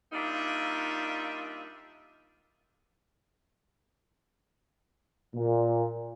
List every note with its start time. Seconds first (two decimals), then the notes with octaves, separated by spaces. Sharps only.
0.13 G3 A#3 D4 D#4 F4 E5
5.35 A#2